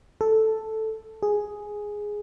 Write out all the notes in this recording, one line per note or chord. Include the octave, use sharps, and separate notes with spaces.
A4
G#4